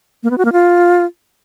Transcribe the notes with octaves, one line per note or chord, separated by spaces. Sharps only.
A#3
B3
F#4
A#3
F4